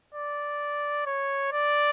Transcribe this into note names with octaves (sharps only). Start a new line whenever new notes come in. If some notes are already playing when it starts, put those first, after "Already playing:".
D5
C#5
D5